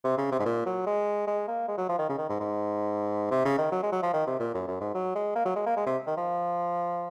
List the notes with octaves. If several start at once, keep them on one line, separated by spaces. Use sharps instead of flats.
C3
C#3
C3
G#2
A#2
F#3
G#3
G#3
A#3
G#3
F#3
F3
D#3
C#3
D#3
G#2
G#2
C3
C#3
D#3
F#3
G#3
F#3
F3
D#3
C3
A#2
F#2
F#2
G#2
F#3
G#3
A#3
F#3
G#3
A#3
G#3
C3
D#3
F3